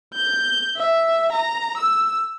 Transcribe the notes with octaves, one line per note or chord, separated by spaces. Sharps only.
G6
E5
A#5
E6